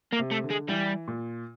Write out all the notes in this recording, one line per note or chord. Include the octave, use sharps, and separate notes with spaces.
A#3
C3
A3
D3
G#3
E3 G3
A#2